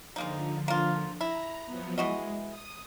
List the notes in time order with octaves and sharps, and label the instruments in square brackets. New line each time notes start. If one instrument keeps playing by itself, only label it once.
[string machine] D3 F3 [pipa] G#3 A#3 D#4
[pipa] A#3 F4
[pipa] E4 [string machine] A#5
[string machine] F3 F#3 B3
[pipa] E3 F#4 D#5 [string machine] G#3
[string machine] D#6